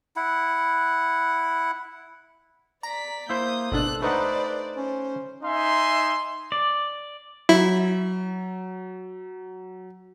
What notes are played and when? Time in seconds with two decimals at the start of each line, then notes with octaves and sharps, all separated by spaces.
0.16 E4 F#5
2.83 D5 A#5 B6
3.29 A#3 E4 C5 D#6 G6
3.72 G#1 B2 D4 A4 F#6
4.02 A3 D#4 B4 C5 D5 F#5
4.77 C#4 C5
5.44 D#4 E5 G#5 C6
6.52 D5
7.49 F#3 E4